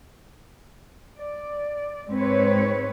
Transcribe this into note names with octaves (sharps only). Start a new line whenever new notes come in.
D5
G#2 G#3 C4 B4 C#5